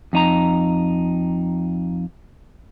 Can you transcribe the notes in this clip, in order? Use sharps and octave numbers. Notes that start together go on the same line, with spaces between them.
F2 D#4 A#5